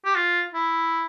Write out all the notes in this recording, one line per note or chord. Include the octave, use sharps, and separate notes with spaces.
G4
F4
E4